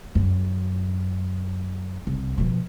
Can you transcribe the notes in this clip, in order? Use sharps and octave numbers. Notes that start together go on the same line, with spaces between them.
F#2
C2
B2 F3